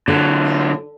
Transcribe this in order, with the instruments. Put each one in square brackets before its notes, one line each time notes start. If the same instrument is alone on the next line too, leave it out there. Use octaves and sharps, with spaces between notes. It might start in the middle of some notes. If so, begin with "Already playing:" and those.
[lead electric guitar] A#2 F#3 [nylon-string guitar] D3